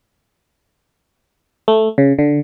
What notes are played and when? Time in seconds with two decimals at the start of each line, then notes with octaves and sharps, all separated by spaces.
1.68 A3
1.98 C#3
2.19 D3